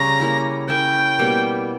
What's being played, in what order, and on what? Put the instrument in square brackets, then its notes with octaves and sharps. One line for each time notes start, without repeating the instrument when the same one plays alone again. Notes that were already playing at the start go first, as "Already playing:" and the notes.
Already playing: [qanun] C#3 G3 C#4 [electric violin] A#5
[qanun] A#3 E4 G4 C#5
[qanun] C#4 E4 A#4 E5 [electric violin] G5
[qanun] B2 G3 A#3 E4